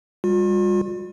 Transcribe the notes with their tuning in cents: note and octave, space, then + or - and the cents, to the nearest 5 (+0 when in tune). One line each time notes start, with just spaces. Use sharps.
G3 +35 F4 +45